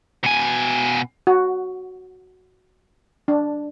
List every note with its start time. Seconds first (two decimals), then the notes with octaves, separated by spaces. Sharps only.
0.24 B2 G#5
1.27 F#4
3.28 D4